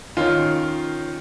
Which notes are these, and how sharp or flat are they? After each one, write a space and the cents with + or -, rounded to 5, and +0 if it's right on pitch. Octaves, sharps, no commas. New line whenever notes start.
D#3 +0 C#4 +0 F4 +0